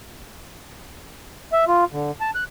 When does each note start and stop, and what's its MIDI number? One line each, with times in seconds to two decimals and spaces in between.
1.52 1.65 76
1.68 1.84 65
1.92 2.11 50
2.21 2.31 81
2.35 2.44 90